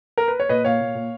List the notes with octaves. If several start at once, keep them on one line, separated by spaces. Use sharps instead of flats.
A#4
B4
C#5
A#2 B4 D#5
A#2 C#5 F5
A#2
A#2